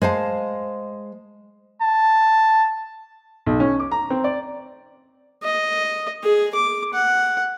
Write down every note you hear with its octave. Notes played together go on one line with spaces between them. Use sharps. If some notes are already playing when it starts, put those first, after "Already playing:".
G#3 C5 F5 A5
A5
B1
C#4
D6
A#5
C4
D5
D#5
G#4
D6
F#5